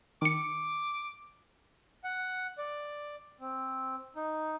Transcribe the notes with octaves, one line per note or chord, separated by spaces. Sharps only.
D#3 D6 C#7
F#5
D5
C4
D#4